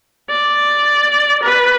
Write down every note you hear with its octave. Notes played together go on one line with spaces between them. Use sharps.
D5
B4